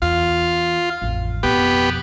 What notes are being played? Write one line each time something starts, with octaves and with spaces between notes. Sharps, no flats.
E2 F4
A1 F2
F2 B2 B3 G4